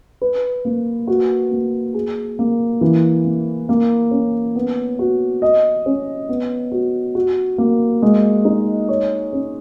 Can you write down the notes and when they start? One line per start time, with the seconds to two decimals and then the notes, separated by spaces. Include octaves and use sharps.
0.22 B4
0.65 A#3
1.08 F#4
1.51 A#3
1.94 G#4
2.39 A#3
2.81 E3
3.24 A#3
3.69 A#3
4.11 C#4
4.56 B3
4.99 F#4
5.42 D#5
5.86 C#4
6.29 B3
6.72 F#4
7.15 F#4
7.58 A#3
8.02 G#3
8.45 D#4
8.89 C#5
9.33 C#4